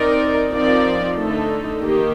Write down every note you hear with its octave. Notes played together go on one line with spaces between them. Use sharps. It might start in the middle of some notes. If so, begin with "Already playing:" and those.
Already playing: C4 D#4 A#4 D5
F3 C4 D#4 A#4 D5
D3 A3 D#4 A4
D#3 A#3 D#4 G4